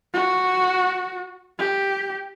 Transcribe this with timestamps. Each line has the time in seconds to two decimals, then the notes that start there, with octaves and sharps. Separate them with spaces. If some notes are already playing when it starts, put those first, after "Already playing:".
0.14 F#4
1.59 G4